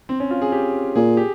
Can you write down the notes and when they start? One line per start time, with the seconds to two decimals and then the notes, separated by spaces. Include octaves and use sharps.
0.09 C4
0.20 C#4
0.31 F4
0.42 G#4
0.52 G4
0.95 A#2 G#4
1.17 G4